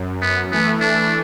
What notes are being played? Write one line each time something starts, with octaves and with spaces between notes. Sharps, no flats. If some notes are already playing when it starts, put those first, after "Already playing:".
Already playing: F#2
F#2 B3
E3 A3 B3
D4